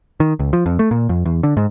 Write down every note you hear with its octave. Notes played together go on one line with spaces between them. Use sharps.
D#3
C#2
F3
F2
A3
A#2
F2
E2
D3
G#2